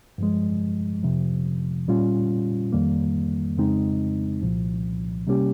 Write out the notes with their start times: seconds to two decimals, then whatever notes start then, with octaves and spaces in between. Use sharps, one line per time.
0.18 G2 F3 G#3
1.03 F2 C3 F3
1.88 A#2 G3 C#4 F4
2.72 F2 D#3 G3 A#3
3.57 F2 C#3 G#3 C4 D#4
4.42 C2 A#2 F3
5.27 C3 G3 A#3 C#4 G4